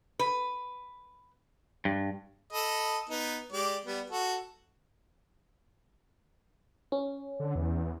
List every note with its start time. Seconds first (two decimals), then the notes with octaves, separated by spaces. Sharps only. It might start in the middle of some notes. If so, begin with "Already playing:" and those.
0.19 B4
1.85 G2
2.53 A4 D#5 B5
3.09 B3 D#4
3.52 G#3 G4 D5
3.85 G3 B3
4.10 F#4 A4
6.92 C#4
7.40 D3
7.55 E2